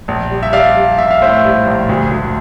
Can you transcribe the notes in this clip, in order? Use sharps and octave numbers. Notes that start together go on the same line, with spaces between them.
A#1
G3
E5
G3 D5 F5
G3
A#1 E5
F5
A2 C5 E5
G3
A#1
D2
D2